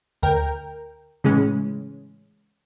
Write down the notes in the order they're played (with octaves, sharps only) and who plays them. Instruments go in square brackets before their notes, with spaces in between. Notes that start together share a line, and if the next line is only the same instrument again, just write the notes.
[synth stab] D2 A#4 G5
A2 C#3 E3 G#3 C#4